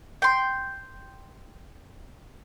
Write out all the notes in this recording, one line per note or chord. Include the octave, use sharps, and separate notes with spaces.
G5 C6